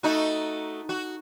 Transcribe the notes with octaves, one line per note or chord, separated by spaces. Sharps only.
A3 D#4 F#4
F#4